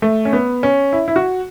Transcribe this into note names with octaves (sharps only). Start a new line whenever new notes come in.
A3
C#4
B3
C#4
E4
E4
F#4